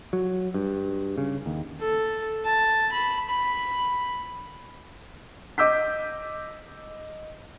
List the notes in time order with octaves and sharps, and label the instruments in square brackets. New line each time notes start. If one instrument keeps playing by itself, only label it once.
[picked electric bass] F#3
G2
C#3
D#2
[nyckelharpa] A4
A5
B5
B5
[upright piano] D#5 D6 E6 G6 B6